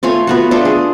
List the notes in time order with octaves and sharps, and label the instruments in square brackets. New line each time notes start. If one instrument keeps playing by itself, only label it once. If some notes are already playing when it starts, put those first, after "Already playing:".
[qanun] A3 F4 C#5 G#5
B3 F4 F#4
A3 D4 F4 A4
G#4